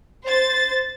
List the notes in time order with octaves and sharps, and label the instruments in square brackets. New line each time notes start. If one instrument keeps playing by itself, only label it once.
[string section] C5 A6